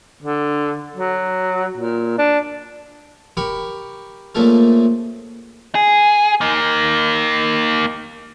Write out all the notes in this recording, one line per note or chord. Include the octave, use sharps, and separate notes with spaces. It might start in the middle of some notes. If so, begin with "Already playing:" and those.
D3
F#3
A#2
D4
G4 A#4 B5 C#6
A#2 C#3 F3 A3 A4 A#4
G#4
A#3 D#4